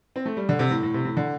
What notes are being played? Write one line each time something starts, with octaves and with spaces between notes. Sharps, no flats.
C4
A3
G3
D3
C3
A2
A2
C3
A2
D3